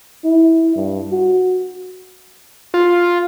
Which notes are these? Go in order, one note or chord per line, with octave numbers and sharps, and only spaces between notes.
E4
G2
F#4
F4